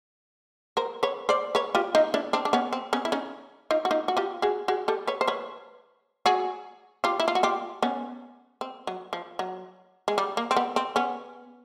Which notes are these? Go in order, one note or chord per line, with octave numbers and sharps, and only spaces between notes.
A#4 C5
B4 C#5
C5 D5
B4 C#5
F4 G4
D#4 F4
D4 E4
C4 D4
D4
B3 C#4
C4
B3 C#4
E4
C#4 D#4
D#4 F4
F#4
D#4 F4
F#4
F4 G4
F#4 G#4
F#4 G#4
G4 A4
B4 C#5
C5
B4 C#5
F#4 G#4
F4 G4
E4
F4
F#4
F4 G4
B3 C#4
C4
F#3
F3
F#3
G#3
G3
A#3
C4
B3
C4
B3 C#4